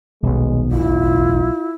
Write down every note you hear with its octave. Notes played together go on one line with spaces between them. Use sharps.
D#1 B1 G#3 B3
E1 A1 D3 E4 F4